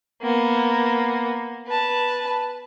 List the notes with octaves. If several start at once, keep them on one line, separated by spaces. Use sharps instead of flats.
A#3 B3
B4 A5